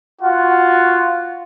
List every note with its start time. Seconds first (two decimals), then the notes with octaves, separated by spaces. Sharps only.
0.21 F4 F#4